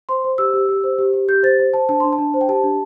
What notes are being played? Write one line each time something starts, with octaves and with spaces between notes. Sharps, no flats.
C5 C6
C5
G4 E6
G4
G4
C5
G4
G4
G4 G6
C5 A6
C5
C5 A5
D4 A5
D4 C6
A5
D4
C5
G5
G4 A5
D4